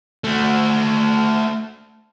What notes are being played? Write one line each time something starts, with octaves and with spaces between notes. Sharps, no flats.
A3 F#4